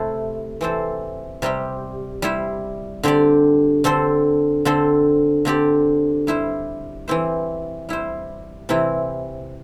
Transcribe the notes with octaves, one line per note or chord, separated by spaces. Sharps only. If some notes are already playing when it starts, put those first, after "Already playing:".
Already playing: C3 A3 E4 A4 C5
E3 C4 A4 C5
C3 G3 C4 G4
G3 E4 C5
D3 C4 G4 D5
D3 C4 A4 C5
D3 C4 A4 C5
D3 C4 G4 D5
G3 E4 C5
E3 C4 E4 C5
G3 E4 C5
C3 E3 C4 E4